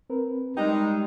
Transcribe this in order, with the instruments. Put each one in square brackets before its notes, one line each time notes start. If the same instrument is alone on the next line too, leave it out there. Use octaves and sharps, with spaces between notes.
[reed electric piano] C4 A#4 B4
[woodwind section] G3 G#3 [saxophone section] D#4 [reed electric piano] G5